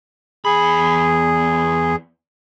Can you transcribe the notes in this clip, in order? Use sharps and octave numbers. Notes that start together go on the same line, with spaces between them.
E2 G#4 B5